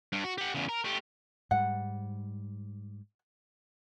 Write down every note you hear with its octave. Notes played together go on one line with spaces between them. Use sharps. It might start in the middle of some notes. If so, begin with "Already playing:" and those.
G2
F#4
G4 F#5
E2 C#3
A#4
A3 G4
G#2 G3 F#5